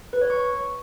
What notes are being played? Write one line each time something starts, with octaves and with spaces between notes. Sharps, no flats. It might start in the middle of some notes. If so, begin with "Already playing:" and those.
B4
C#5
C#6